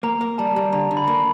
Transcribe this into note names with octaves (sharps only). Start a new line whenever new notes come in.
A#3 A#5
A#3
G3 A5
G3
D3 A#5
D3
B5
A#3